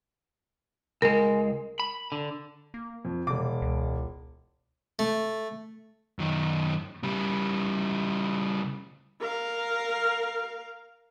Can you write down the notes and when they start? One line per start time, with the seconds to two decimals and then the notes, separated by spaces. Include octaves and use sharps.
1.02 C#2 G#3 A#4
1.80 B5
2.12 D3
2.74 A#3
3.05 F2
3.27 E1 C3 D6
3.62 C#2
4.99 A3
6.19 F#2 D#3
7.03 C#3 G3
9.20 A#4 F5